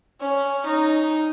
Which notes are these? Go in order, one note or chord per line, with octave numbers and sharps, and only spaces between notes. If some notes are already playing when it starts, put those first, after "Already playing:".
C#4
D#4